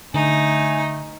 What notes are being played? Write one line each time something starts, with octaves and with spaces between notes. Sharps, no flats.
D3 A3 D#4 G#5